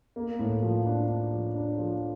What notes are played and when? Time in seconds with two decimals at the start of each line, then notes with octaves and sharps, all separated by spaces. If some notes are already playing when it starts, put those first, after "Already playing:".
0.16 A#3
0.39 A2
0.63 F3
0.86 D4
1.08 D4
1.32 F3
1.55 D4
1.78 F3